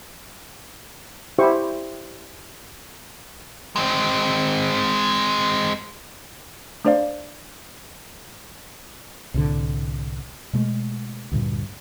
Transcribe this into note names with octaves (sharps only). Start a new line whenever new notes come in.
E4 G4 C5 C#6
G#3 C4
A3 D4 C5 D5 F5
C2 A2 D3
B2 G#3 A3
D2 G2 A#2